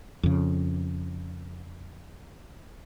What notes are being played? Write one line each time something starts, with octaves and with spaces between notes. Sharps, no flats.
F2 C#3